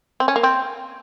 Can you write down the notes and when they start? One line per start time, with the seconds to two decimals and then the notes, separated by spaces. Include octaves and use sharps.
0.20 C4
0.28 C#4
0.36 A#3
0.43 C4